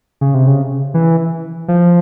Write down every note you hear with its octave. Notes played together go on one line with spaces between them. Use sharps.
C#3
C3
C#3
E3
F3